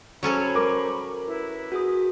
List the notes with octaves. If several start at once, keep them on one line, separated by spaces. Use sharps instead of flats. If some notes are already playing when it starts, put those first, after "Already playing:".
F#3 C#4 A4 C5 B5 C#6
A#4 D6
E4 B4
F#4 G#4 D#6